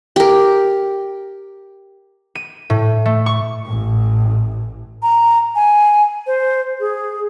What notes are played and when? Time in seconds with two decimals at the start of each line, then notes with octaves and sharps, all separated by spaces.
0.16 G4 A#4
2.35 D#7
2.70 A2
3.05 A3
3.26 C#6
3.65 A1 A2
5.03 A#5
5.55 G#5
6.27 C5
6.80 G#4